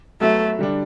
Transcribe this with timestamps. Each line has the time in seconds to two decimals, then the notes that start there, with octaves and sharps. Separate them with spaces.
0.20 F#3 A3 B3 F#4 B4 E5
0.59 D3 G3 D4